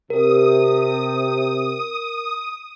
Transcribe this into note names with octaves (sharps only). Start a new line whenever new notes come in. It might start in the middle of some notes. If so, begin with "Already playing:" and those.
C3 A#4 D#6